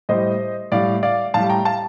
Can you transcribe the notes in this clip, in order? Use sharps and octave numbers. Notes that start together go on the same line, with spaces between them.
A2 G3 C5 D#5
A2 G3 D5 F5
D5 F5
A2 G3 F5 A5
G5 A#5
F5 A5